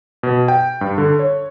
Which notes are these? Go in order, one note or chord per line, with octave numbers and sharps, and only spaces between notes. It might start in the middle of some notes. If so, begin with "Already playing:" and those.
B2
G5
G2
D3
C#5